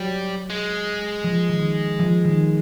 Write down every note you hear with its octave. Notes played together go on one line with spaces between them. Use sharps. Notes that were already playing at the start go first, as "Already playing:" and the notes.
Already playing: F#3 G3
G#3
F3
D#3
F3
D#3